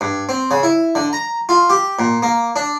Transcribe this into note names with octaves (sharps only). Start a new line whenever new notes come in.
G2
C4
C#3
E4
D3
A#5
F4
G4
A#2
A#3
D4